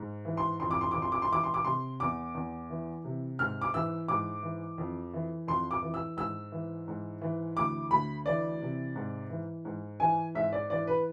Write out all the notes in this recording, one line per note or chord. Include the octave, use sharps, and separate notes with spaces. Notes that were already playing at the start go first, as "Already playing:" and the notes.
Already playing: G#2
E3
C6
F2 C6
D6
C6
F2 D6
C6
D6
C6
E3 D6
C6
D6
C3 C6
E2 D6
E2
E3
C3
G#2 F6
D6
E3 E6
G#2 D6
E3
F2
E3
F2 C6
D6
E3
E6
G#2 E6
E3
G#2
E3
D2 D6
D2 B5
E3 D5
C3
G#2
E3
G#2
E3 G#5
G#2 E5
D5
E3 D5
B4